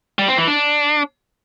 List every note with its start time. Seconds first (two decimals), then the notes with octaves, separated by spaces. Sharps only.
0.19 G3
0.28 C4
0.38 E3
0.47 D4